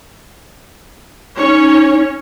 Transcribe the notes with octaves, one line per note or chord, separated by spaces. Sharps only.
C#4 D#4 C#5